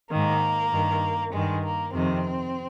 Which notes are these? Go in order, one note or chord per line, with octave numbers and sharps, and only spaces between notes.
G#2 D#3 A#3
G2 D#3
G2 D#3 G#3
A#3
F2 C3 D#3 C4